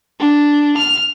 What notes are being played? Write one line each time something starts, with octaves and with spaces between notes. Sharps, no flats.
D4
F6